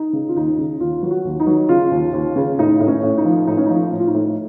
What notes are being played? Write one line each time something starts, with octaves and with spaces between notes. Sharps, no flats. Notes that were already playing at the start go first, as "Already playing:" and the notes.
Already playing: D#4
C#3
F4
D#2 D#4
C#3
D#2 F4
F#3
F#4
D#2
D#4
F#3
C#3 F4
D#2
D#2
C#3
A2 D#4
A2
C#4
A2
D#4
F3
A2 D#4
C#4
F3 D#4
A2
F4
D#4
A2